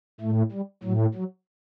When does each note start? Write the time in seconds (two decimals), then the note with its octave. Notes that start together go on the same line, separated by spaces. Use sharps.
0.20 A2 A3
0.52 G3
0.83 A2 F#3
1.15 F#3